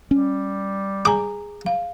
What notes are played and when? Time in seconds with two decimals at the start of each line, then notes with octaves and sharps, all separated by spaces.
0.11 G3 C#4
1.05 G#4 G#5 A#5 D6
1.66 F5